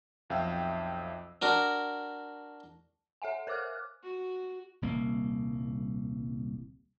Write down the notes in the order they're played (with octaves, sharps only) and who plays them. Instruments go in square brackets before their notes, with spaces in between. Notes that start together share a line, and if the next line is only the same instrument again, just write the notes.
[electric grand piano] B1 F2 E5 F5 G5 E6
[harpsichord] D4 F#4 A#4
[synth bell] A4 E5 F#5 G#5
A#4 C5 C#5 D6 F6 F#6
[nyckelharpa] F#4
[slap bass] D#1 C2 A#3